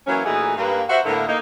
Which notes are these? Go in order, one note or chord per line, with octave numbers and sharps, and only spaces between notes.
E3 F#3 A#3 C#4
A#2 E3 A3 D#4 F#4 G#4
G2 A#3 B4
F#4 C5 E5
A2 D3 A#3 B3 E4 A#4
A#3 D#4